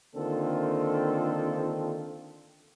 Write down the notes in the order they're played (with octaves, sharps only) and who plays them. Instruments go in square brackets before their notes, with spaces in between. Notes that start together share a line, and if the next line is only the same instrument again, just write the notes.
[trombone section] D3 D#3 A#3 C4 F4 A4